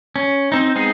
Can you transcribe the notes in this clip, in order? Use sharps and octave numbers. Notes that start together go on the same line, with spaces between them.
C#4
C4 D#4
G#3 B3 C4 D#4 G#4